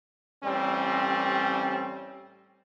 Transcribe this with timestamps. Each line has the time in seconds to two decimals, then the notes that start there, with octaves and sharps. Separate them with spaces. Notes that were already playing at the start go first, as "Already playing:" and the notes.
0.44 A1 G3 C4 C#4